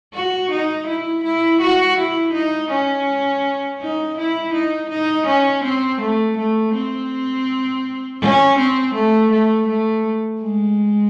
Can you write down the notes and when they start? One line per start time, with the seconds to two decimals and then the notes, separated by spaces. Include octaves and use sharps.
0.14 F#4
0.51 D#4
0.87 E4
1.24 E4
1.61 F#4
1.98 E4
2.33 D#4
2.71 C#4
3.81 D#4
4.18 E4
4.54 D#4
4.90 D#4
5.27 C#4
5.64 C4
6.01 A3
6.38 A3
6.75 C4
8.21 C#4
8.58 C4
8.94 A3
9.31 A3
9.68 A3
10.41 G#3